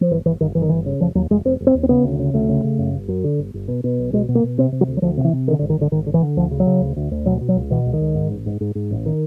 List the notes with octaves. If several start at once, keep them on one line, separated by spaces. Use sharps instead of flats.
F3
G1 E3
G1 E3
G1 D#3
G1 E3
D#3
G1 E3
C#3
F1 F3
D#2 F#3
F1 G#3
F1 C4
F1
C4
D#2
C4
C#3 B3
D2
C#3
D2 A3
C#3
C#3
F#2
G1
F#2
D3
G1
G1
B2
B2
B1
B2 G#3
B2
A#3
B2
C3 C4
C3
F#3
D2
F#3
D2 F3
C3
E3
C3
D3 D#3
D3
G#1
D#3
G#1 D3
G#1 D#3
D3
E3
D3
D2 F3
C#3
F#3
C#3
D2
D2
D2
B2 F#3
B2
F#3
C#2
B2 E3
C#2
D#3
C#2
G#2
A1
G#2
G#2
G#2
A1
D#3